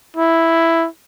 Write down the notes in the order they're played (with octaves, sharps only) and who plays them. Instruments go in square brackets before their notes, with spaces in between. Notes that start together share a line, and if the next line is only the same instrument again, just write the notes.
[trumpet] E4